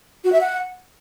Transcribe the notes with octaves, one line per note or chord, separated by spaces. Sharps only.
F#4
E5
F#5